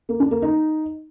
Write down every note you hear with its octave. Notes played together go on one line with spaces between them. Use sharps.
A#3
D4
A#3
D#4